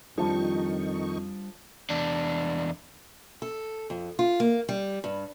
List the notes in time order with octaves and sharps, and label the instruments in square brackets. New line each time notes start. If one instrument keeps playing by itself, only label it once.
[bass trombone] F2 [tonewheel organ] D#3 D#4 C#6 [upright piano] F3 [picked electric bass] G3 A3 D4
[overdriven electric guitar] E2 D4
[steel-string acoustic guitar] A4
F2
F4
A#3
G3
G2